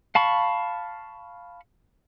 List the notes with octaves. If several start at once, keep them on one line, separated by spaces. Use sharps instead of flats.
F5 A5 B5 C#6